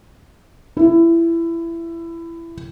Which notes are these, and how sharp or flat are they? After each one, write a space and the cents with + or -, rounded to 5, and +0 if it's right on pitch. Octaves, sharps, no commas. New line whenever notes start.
E4 +20